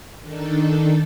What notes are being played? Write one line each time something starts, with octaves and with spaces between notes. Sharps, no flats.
D#3 D4 D#4 A4